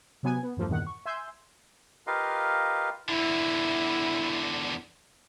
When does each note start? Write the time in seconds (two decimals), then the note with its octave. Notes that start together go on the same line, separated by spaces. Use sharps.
0.23 C3 F#3 B3 G#5 G#6
0.43 B3
0.57 E2 G2 F3 A3 A#3
0.68 E2 G2 A#2 D#3 F#5
0.87 C#6
1.06 E5 G#5 C6 E6 G6
2.07 F4 G4 A#4 B4 D#5 F5
3.09 E2 D3 E4